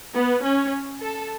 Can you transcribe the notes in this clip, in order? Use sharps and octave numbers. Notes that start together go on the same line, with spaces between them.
B3
C#4
A4